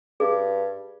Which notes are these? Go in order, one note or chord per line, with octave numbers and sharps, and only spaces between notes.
G2 G#4